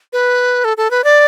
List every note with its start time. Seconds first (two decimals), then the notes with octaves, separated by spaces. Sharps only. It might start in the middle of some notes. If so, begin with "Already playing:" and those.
0.13 B4
0.65 A4
0.77 A4
0.91 B4
1.04 D5